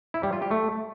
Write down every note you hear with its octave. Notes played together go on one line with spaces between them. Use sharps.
E4
G3
F4
G4
A3